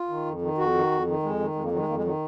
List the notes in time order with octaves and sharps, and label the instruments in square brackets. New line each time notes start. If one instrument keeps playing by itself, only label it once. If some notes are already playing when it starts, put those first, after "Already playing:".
Already playing: [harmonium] F4
D#3
F2
D#3
F2 F#4
D#3
F2
D#3
F2 G#3
D#3
F2 G#3
A#3
D#3 F#3
G#3
F2 A#3
G#3
D#3 F#3